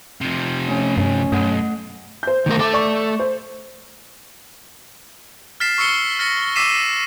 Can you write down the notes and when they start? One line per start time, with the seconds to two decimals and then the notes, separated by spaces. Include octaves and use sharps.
0.21 C3 F3
0.68 A3 C#4
0.97 G2 C#4
1.32 B1 G2 A3 F#5
2.23 C5 G6
2.46 D#3 A3 A#4
2.59 A3 A4 D6
2.73 D5 C#6
3.19 C5
5.60 F6 A6 B6 C7 E7
5.78 C#6 E6 C7 C#7 G7
6.19 F6 A6 A#6 C7 C#7
6.56 D6 E6 B6 C7 D#7 E7